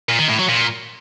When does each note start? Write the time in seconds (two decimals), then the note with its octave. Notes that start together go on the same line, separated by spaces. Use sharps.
0.09 A#2
0.19 D#3
0.29 A2
0.39 F#3
0.49 A#2